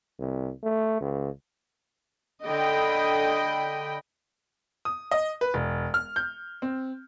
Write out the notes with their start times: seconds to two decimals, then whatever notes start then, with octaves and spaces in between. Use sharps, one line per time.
0.19 C2
0.63 A3
1.01 C#2
2.45 D3 D#5 G5 B5
4.85 D#6
5.11 D#5
5.41 B4
5.54 E1
5.94 F6
6.16 G6
6.62 C4